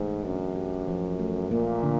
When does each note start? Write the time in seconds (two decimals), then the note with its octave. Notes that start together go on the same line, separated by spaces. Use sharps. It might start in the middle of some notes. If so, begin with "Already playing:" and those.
Already playing: G#2 E3 A3
0.25 F#2 D4
0.56 G4
0.88 F3
1.19 A3
1.51 A#2 A#3
1.83 D3